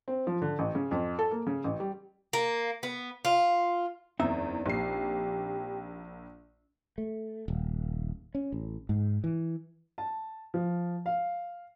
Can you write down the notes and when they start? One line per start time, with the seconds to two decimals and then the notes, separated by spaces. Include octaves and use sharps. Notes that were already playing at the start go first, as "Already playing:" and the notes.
0.08 C4
0.27 F3
0.42 D3
0.59 A1
0.75 C#3
0.91 F2
1.19 A4
1.31 A#3
1.47 C#3
1.64 A1
1.80 G3
2.33 A#3
2.83 B3
3.25 F4
4.19 F#1 E2 C4 D#4 E5
4.66 A#1 G4 C7
6.98 A3
7.48 D#1
8.35 C#4
8.52 A1
8.89 G#2
9.24 E3
9.98 A5
10.54 F3
11.06 F5